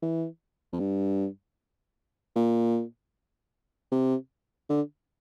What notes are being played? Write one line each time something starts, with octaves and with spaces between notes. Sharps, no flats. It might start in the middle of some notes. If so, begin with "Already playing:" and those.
E3
F2
G2
A#2
C3
D3